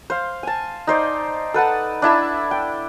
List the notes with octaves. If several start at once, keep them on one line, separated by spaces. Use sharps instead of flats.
C5 F5
G#5 A5
D#4 C5 D5
A4 B4 F#5 A5
D4 E4 A5 B5
G5